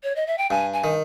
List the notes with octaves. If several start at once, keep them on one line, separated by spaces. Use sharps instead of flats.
C#5
D#5
E5
G5
G2 G#5
G#5
D#3